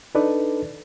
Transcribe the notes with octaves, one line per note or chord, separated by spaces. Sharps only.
D4 D#4 A4 B4 D5